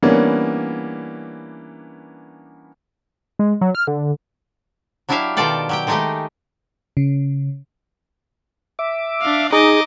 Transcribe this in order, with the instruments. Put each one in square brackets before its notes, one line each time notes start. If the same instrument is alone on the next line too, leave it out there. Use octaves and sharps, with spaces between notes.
[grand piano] E3 G3 A#3 B3 C#4 D4
[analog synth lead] G#3
F#3
F6
D3
[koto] F#3 D4 E4 G4 E5 F5
B2 D#3 F4 A4 D5 G5
F#3 G4 G5
D#3 G#3 A3 D#4 G4 D#5
[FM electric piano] C#3
[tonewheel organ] E5 D6
[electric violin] D4 F5
[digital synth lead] D#4 [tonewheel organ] G#4 [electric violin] D#5 D6